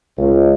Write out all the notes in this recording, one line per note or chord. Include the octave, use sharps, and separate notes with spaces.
C#2